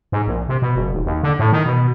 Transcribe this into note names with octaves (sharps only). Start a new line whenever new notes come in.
G#2
A#1
C3
B2
F#1
D#1
D#2
D3
A2
D#3
B2